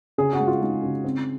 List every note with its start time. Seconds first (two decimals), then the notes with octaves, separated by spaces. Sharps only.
0.18 C#3 G#4
0.33 F#4
0.40 G#3
0.47 F4
0.61 G#3 D#4
0.83 C#3
1.04 C4